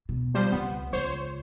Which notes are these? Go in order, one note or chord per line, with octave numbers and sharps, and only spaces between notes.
B2
F3 G3 C5
C#2 B3
C#2 C5 C#5